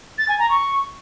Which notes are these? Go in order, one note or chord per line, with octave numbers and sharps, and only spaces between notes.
A6
G#5
A#5
C#6